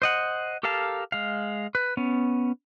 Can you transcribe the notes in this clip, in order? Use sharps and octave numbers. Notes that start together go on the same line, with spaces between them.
C5 D#5 F#5
G4 A4 A#4 F5 A5
G#3 F5
B4
B3 C#4